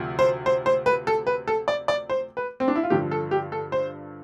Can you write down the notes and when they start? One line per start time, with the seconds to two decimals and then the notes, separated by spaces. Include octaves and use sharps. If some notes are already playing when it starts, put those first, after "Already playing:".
Already playing: D2 C3 F3
0.19 C5
0.46 C5
0.66 C5
0.86 B4
1.07 A4
1.27 B4
1.47 A4
1.68 D5
1.88 D5
2.10 C5
2.37 B4
2.60 C4
2.68 D4
2.76 E4
2.83 F4
2.90 G2 D3 F3 G4
3.11 A4
3.31 G4
3.52 A4
3.72 C5